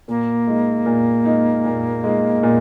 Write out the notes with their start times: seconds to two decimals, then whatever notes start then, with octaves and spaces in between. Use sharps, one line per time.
0.08 A#2 A#3
0.47 G#3 D#4
0.86 A#2
1.25 G#3 D#4
1.65 A#2
2.04 G#3 D#4
2.43 A#2